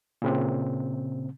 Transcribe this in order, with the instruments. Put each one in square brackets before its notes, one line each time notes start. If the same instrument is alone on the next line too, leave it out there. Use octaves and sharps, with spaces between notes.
[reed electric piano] A#2 C#3 C4